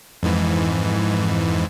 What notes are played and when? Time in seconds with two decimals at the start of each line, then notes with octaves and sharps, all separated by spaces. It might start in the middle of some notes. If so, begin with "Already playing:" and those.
0.23 F2 G#2 E3